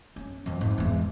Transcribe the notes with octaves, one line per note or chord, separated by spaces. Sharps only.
C#4
F2 E3
G#2
E2 G#3